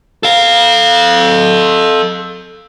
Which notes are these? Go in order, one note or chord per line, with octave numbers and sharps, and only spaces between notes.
A4 F5